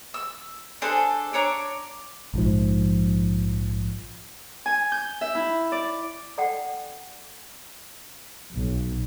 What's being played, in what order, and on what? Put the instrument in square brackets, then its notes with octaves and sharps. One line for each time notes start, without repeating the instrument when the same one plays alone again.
[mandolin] E6
D4 G#4 A4 C5
D4 C#5 A#5 D6
[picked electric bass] A#1 G#2 F3
[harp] G#5
G6
E5
E4
D5
[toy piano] A4 D5 F#5 G5
[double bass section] B1